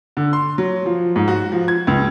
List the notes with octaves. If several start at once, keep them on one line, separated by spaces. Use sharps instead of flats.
D3
C6
F#3
F3
G#2
F#4
F3
G#6
C#2